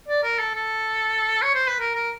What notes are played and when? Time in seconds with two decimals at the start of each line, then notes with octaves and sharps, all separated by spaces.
0.08 D5
0.23 A#4
0.39 A4
0.55 A4
1.42 C#5
1.55 C5
1.68 B4
1.80 A#4
1.95 A#4